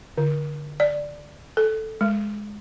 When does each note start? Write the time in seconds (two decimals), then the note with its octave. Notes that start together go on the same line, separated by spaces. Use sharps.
0.18 D3
0.80 D5
1.57 A4
2.01 G#3